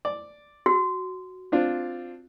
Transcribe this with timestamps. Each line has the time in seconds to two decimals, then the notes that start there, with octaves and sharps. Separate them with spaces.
0.05 D5
0.66 F#4
1.52 C4 D4 F4